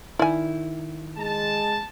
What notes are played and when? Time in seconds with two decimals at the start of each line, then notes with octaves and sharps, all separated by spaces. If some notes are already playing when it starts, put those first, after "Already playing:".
0.19 D#3 E4 D5 G#5
1.17 G#3 A5